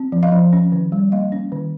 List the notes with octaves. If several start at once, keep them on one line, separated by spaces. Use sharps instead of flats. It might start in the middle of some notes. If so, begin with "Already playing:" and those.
Already playing: C4
F3
D#5 F5
F3
C#4
D#3
G3
A#3 D#5 F5
C#4
D#3